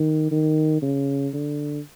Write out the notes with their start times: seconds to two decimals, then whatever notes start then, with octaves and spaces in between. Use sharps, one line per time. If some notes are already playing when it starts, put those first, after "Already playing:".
Already playing: D#3
0.31 D#3
0.82 C#3
1.34 D3